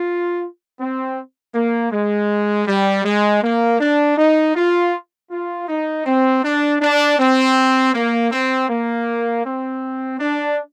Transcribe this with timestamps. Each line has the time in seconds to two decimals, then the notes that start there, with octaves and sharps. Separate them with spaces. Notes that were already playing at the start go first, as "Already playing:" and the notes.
Already playing: F4
0.80 C4
1.55 A#3
1.92 G#3
2.68 G3
3.05 G#3
3.43 A#3
3.80 D4
4.18 D#4
4.56 F4
5.31 F4
5.69 D#4
6.06 C4
6.43 D4
6.81 D4
7.19 C4
7.95 A#3
8.32 C4
8.70 A#3
9.45 C4
10.20 D4